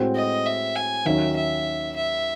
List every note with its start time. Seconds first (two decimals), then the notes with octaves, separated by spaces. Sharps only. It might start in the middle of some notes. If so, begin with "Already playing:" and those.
Already playing: A2 G#3 C4 F#4
0.15 D#5
0.46 E5
0.75 G#5
1.05 D#2 D#3 F#3 C#4 E5
1.36 E5
1.96 E5